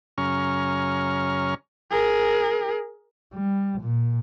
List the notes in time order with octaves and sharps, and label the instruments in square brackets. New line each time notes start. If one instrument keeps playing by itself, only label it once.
[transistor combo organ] F#2 C#3 C#4 A#5 C#6 F6
[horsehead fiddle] G#4 A#4
[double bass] G3
A#2